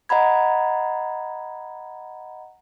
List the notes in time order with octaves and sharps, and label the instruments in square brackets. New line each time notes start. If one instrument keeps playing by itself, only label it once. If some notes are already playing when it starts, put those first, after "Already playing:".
[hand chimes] D#5 F#5 A#5 B5 G#6